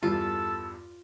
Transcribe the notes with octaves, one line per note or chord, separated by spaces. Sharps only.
E2 G2 F4 A4 A5 E6